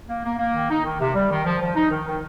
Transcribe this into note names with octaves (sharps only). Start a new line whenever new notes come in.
A#3
A#3
A#3
D#3
D#4
D#3
C3
G3
D#3
F3
F3
D#4
D#3
D#3